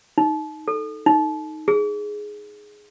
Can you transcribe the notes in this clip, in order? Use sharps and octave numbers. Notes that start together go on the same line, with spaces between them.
D#4
A4
D#4
G#4